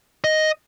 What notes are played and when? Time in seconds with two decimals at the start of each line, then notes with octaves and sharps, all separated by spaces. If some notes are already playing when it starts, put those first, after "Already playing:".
0.24 D#5